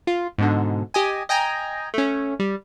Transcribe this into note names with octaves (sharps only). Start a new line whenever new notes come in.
F4
G#2 B2 D3
G4 D#5 G#5
D#5 G5 G#5 A#5
A3 C#4
G3